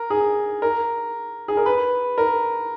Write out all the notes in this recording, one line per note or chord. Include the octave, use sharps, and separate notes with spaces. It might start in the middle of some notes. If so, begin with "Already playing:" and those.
Already playing: A#4
G#4
A#4
G#4
A#4
B4
A#4